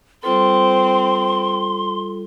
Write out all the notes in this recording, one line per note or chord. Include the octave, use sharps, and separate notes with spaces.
G3 C4 F4 A4 C6